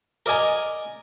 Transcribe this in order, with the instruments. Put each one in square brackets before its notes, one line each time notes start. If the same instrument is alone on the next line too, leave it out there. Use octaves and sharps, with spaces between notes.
[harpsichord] A#4 D5 D#5 G#5 A#5